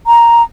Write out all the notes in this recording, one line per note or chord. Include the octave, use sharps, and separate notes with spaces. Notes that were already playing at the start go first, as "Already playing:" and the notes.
A#5